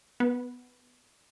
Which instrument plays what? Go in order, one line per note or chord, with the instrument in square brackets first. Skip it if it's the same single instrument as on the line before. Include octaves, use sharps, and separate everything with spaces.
[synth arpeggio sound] B3